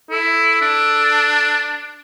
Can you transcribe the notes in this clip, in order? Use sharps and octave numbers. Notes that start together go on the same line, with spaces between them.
E4 A4
D4